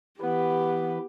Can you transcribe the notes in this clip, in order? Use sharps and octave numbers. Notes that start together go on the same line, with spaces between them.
E3 B3 G4 B4